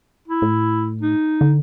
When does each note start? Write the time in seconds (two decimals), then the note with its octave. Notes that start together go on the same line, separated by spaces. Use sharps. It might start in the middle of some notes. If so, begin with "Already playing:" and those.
0.28 E4
0.42 A2
1.02 D#4
1.41 D3